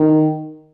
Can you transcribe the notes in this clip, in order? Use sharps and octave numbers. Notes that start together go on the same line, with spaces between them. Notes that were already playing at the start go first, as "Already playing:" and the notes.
Already playing: D#3